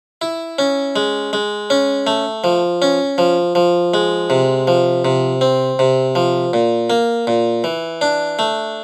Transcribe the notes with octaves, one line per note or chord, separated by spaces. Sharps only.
E4
C#4
G#3
G#3
C#4
A3
F3
C#4
F3
F3
G#3
C3
F3
C3
C4
C3
F3
A#2
A#3
A#2
E3
D4
A3